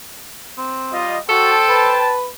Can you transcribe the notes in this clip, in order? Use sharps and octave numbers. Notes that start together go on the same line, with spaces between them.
C4
G3 F4 D#5
F#4 A4 C5 G5 A5
B4